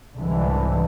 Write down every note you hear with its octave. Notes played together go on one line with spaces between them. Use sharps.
C2 G#2 D3 E3